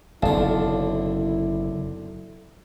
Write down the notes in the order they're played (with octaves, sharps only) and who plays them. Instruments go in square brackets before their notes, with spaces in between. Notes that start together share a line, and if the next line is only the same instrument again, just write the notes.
[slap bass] F#1 [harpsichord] B1 D3 [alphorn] E4 [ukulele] F5 A5